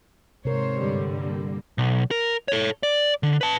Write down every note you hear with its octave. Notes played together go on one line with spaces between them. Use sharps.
G#2 C3 A#4 C5 C#5
G2 D3 G3
A#3
B1
A#4
A4 C#5
D5
D3
B4 A5